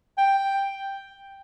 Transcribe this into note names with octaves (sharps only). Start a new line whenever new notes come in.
G5